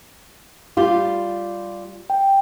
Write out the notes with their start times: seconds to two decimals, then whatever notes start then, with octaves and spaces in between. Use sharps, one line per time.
0.77 G3 F4 G4
2.10 G5